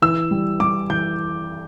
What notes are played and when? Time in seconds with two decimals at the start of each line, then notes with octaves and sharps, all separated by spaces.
0.02 E3 E6
0.31 G3
0.60 G3 D6
0.90 E3 G6